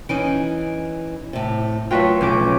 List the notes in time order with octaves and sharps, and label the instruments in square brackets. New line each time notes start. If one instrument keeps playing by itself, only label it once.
[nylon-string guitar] E3 C#4 D#4 [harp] D7
[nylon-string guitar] A2 C3
[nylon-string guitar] F#3 A3 G5 [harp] F4 F#4 B4
[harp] B1 C#4 D6